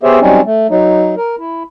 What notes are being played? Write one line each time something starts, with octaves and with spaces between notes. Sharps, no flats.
B3 G4 G#4 C5 C#5 E5
F#3 G3 C4 C#4 D#4
A3
F#3 D#4
A#4
E4